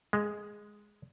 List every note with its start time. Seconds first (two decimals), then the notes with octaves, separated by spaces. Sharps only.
0.13 G#3